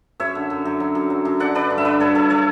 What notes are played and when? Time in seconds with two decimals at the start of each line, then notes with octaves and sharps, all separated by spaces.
0.20 F#2 C#5 E5
0.35 D3
0.50 F#2
0.65 F#2
0.80 F#3
0.95 F#2
1.10 F#3
1.25 F#2
1.40 D3 D5 F#5
1.55 D3 B4 D5
1.70 G2
1.78 E5
1.85 F#3 B4 D5
2.00 G2 A4 C#5
2.15 G2 A4 C#5
2.30 F#3 A4 C#5